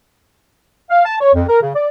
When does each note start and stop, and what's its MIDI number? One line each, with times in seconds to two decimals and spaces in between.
0.90 1.03 77
1.06 1.16 81
1.20 1.30 73
1.34 1.43 41
1.48 1.57 70
1.62 1.70 49
1.75 1.87 74